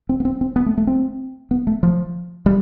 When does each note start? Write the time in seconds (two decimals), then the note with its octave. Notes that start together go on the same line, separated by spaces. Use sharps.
0.09 C4
0.20 B3
0.25 C4
0.41 C4
0.56 B3
0.66 A3
0.78 A3
0.87 C4
1.51 B3
1.67 A3
1.83 F3
2.46 G3